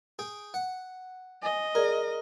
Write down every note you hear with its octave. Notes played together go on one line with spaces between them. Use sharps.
G#4 G5
F#5
D#5 G#5
G#4 A#4 D5